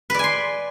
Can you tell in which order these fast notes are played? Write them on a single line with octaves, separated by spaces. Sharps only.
B4 D5 G#5 C6